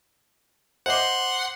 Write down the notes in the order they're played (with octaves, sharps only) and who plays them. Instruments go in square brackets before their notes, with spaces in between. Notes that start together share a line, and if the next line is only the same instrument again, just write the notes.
[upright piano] C5 D#5 D6 [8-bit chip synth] F#5 C6